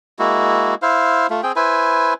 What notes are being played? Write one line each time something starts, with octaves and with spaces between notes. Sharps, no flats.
G#3 A#3 E4 F#4
E4 C5 F5
A3 F4
C4 G#4 G5
E4 B4 C5 G#5